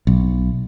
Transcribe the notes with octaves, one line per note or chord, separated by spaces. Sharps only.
B1